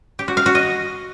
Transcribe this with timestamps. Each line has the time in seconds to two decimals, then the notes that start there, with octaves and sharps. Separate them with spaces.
0.19 G4
0.28 F#4
0.37 F5
0.46 F#4
0.55 D#5